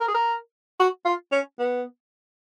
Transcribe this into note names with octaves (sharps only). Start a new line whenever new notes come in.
A#4
G#4
A#4
F#4
F4
C#4
B3